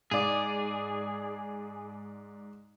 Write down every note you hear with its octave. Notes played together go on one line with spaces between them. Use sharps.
G#2 G#4 D5